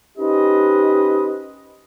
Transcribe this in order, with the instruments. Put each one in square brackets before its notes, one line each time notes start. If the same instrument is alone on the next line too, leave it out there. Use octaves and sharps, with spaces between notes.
[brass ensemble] C#4 D#4 G4 B4 C5 D#5